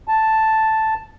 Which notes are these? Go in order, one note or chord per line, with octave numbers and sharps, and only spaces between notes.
A5